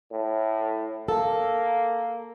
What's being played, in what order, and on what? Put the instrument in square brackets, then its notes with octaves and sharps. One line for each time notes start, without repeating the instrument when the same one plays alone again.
[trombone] A2
[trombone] A#3 [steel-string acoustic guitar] A4